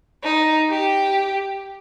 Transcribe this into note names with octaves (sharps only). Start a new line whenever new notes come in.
D#4
G4